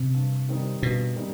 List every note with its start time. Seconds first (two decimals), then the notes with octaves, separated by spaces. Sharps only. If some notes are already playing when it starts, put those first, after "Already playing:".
Already playing: C3
0.14 G2
0.49 D#3 G3 C4 D#4
0.82 G2 B2
1.16 D#3 G3 C4 D#4